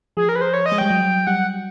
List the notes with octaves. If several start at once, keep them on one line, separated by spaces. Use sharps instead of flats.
F3 G#4
A#4
B4
C5
C#5
D#5
G#3
G3 G5
F#3
G3 F#5